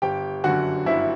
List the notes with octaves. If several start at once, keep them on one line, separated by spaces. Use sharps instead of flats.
G1 G4 G5
F#2 D3 F#4 F#5
G1 E4 E5